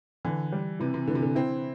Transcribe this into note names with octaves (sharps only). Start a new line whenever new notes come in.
D3 E3
G3
C3 E3
C3
D3 E3
C3
D3
C4 E4